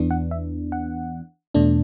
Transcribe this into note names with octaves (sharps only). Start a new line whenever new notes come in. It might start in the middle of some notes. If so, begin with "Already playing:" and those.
Already playing: E2 E3 B3 D4
F#5
E5
F#5
E2 B2 A3 D4